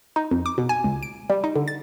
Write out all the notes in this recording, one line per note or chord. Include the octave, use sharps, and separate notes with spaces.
D#4
F2
D6
B2
G#5
C#2
D7
G3
D#4
D3
A6